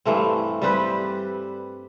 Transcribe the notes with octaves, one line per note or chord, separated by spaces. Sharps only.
G2 E3 A3 C4
G3 C4 G4 B4